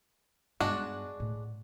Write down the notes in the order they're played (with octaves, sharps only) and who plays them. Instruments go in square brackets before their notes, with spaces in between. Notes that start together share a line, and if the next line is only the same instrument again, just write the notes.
[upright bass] G2 B3 [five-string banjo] G#3 D4 F#4
[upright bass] A2